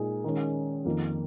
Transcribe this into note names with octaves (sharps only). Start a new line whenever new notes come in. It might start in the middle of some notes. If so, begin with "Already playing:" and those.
Already playing: A#2 G#3 D#4 G#4
D#3 G#3 C#4
F2 D#3 A#3